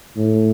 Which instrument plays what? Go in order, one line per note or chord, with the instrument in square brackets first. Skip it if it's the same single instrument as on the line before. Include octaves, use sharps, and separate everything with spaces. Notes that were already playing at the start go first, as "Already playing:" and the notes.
[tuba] A2